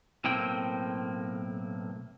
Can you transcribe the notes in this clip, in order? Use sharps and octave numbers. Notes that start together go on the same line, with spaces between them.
B1 A2 A#3 C4 G5